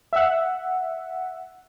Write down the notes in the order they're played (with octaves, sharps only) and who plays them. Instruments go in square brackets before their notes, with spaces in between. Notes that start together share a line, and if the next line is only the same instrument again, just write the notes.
[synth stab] E5 F#5